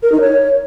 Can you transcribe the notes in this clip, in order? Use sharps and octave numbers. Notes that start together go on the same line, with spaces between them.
A#4
D#4
C#5